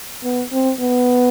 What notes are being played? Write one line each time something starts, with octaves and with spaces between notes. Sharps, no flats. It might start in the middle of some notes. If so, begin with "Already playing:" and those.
B3
C4
B3